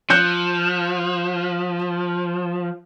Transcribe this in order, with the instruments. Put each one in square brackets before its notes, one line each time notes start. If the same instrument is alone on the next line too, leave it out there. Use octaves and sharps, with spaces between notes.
[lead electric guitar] F3 [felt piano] F#6 G6 C#7